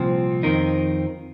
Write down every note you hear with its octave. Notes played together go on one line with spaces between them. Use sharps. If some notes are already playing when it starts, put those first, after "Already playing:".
Already playing: C2 A#2 F3 C4
F2 D#3 C4 D#4 A#4